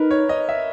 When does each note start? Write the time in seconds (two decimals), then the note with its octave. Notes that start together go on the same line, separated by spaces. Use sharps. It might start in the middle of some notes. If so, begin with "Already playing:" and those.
Already playing: D#4 A#4 B4
0.11 C#5
0.29 D#5
0.49 E5